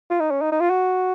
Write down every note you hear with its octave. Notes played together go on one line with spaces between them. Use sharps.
F4
D#4
C#4
D#4
D#4
F4
F#4